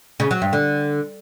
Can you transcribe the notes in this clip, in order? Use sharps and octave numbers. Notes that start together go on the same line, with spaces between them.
C#3
F#3
G2
D3